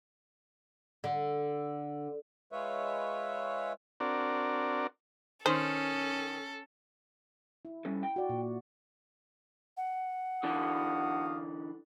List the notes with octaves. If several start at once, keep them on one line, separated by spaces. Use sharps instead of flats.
D3
G#3 F4 B4 C#5 E5
C4 D4 F#4 A#4 D5
D#3 C#4 A4 C5
E4
G3 C#4 A4
G5
F#4 D5
A#2
F#5
D3 E3 D4 F#4 F5 D#6